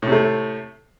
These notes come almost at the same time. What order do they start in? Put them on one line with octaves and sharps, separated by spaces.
A2 C3 A3